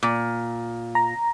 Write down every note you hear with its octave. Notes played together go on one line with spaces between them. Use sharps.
A#2
A#5